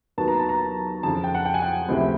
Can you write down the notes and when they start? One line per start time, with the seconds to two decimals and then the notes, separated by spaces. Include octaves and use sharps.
0.18 D#2 D#3 F#3 B3 A5
0.28 A#5
0.39 A5
0.49 A#5
1.03 F2 C#3 F3 A5
1.24 G5
1.35 F#5
1.45 G5
1.54 G#5
1.62 G5
1.89 C#2 C3 F3 A3